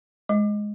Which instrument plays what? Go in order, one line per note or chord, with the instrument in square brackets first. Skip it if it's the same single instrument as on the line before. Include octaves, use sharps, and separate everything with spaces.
[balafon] G#3